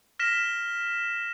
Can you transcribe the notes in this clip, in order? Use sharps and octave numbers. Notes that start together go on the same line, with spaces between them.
F6 A#6 B6 E7